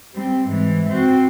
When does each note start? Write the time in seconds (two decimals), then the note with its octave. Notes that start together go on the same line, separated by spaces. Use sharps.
0.15 G3 C4
0.49 G#2 E3
0.89 C4 F#4